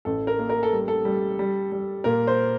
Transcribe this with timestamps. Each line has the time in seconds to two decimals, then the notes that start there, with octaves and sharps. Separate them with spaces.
0.05 A1 A4
0.27 A#4
0.39 A#3
0.50 A#4
0.63 A4
0.72 G3
0.88 A4
1.05 G3
1.39 G3
1.72 G3
2.04 A#2 A#4
2.27 C5